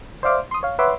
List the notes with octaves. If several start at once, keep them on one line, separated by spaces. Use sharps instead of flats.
C5 D5 E5 F5 D6
C6 D#6
C#5 F5
B4 C#5 E5 F#5 C6 D6